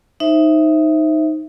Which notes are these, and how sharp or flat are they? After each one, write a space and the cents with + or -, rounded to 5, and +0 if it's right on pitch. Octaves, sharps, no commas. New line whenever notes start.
D#4 +0 C5 +20 E5 +0